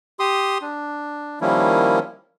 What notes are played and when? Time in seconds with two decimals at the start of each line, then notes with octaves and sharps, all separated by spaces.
0.20 G4 C6 D#6
0.61 D4
1.41 D#3 F3 G3 A#3 C#4 E4